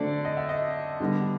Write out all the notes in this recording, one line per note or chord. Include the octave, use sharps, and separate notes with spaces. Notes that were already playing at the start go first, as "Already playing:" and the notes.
Already playing: D3 F#3 A3 C4 D5
D#5
E5
D#5
D3 G3 B3